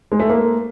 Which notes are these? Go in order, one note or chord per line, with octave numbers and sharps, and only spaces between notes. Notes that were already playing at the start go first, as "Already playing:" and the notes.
G#3
A3
A#3